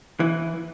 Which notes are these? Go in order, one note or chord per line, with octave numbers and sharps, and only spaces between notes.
E3